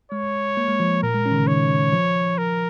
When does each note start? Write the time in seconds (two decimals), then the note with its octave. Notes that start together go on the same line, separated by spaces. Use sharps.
0.12 G#3 C#5
0.57 A#3
0.68 G#3
0.80 F3
1.03 A#2 A#4
1.14 G#3
1.26 C#4
1.31 D#3
1.36 C#3
1.47 D#3 C#5
1.93 F3
2.38 A#4